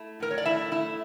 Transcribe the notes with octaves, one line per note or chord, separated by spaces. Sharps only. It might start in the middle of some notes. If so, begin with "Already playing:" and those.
Already playing: A3 E4
A2 A#4
C#5
D5
A3 E4 E5
A3 E4 E5